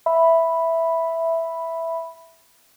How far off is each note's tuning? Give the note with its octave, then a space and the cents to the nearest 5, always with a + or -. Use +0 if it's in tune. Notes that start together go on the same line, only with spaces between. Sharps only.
E5 +0 B5 +0